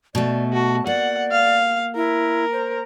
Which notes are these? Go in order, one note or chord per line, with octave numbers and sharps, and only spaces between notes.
B2 A3 D5
F#4 A5
A#3 D5 F#5
F5
E4 A#4
C5